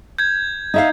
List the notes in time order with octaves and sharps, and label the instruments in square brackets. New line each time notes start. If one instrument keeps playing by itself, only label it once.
[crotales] G6 G#6
[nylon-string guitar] D#4 E5 F5